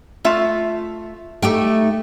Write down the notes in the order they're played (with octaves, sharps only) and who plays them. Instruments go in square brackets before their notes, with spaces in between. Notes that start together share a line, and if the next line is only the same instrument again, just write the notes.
[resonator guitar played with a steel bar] A3 F4 E5
[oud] A3 D#4 G4 [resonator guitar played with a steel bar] G5